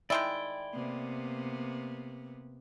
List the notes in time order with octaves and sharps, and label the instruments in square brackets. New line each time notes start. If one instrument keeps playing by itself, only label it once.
[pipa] D#3 G#3 E4 [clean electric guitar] D5 G5
[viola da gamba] C3 A#3 B3